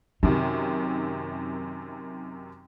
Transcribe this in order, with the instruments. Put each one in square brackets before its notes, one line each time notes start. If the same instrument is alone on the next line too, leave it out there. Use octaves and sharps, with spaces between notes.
[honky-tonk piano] F#2 C3 D#3 [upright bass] D#4